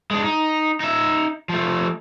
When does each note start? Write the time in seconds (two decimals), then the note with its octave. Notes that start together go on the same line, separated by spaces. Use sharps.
0.11 G#3 D4
0.24 D#4
0.80 D#4 E5
1.49 F3 A3